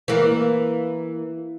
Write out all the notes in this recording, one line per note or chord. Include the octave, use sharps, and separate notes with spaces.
E3 A#3